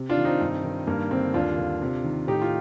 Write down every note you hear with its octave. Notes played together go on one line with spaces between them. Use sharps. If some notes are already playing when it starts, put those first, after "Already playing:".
Already playing: C3
D4 F4
D#3
C4 D#4
G2
D#3
G2 A#3
D3 C4
D#2 D4 F4
D3
C3
D#3
A2 D#4 G4
F4